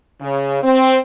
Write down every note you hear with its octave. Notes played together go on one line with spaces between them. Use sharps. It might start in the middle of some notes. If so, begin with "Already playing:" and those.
C#3
C4